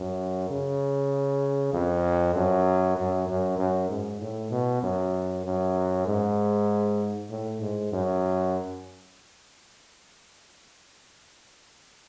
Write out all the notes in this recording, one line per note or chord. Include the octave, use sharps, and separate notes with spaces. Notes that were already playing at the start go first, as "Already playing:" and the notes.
Already playing: F#2
C#3
F2
F#2
F#2
F#2
F#2
G#2
A2
B2
F#2
F#2
G#2
A2
G#2
F#2